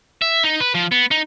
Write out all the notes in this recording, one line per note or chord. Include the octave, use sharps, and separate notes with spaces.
E5
D#4
B4
F3
B3
D#4